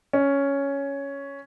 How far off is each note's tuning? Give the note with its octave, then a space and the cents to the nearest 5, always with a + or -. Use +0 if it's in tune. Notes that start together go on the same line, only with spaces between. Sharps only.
C#4 +5